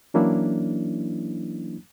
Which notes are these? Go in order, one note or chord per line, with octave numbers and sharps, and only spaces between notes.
E3 F#3 A#3 C#4 D4 E4